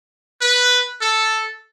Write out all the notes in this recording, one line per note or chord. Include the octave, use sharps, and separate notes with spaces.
B4
A4